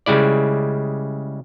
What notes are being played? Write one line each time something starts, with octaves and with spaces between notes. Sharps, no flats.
C#3 G3 G#3 E4 D5